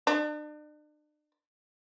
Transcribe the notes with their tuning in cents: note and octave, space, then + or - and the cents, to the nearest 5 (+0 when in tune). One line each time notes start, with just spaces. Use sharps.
D4 +40